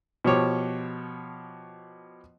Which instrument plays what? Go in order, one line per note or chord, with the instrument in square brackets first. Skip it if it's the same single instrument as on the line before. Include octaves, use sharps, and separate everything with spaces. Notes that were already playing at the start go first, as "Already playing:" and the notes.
[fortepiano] B2 F3 G4 C#5 D6